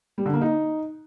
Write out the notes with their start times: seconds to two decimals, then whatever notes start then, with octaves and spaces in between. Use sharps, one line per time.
0.18 G3
0.26 D3
0.33 A#3
0.41 D#4